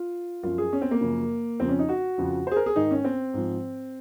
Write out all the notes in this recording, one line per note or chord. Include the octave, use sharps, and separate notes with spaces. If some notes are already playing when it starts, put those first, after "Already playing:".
Already playing: F4
F#2 F3 F4
G#4
C#4
C4
A#3
F#2 C#3 F3
F2 C#3 F3 C4
C#4
D#4
F#4
F2 C#3 F3
G#4 C5
A#4
G#4
G#2 D#3 D#4
C#4
C4
G#2 F3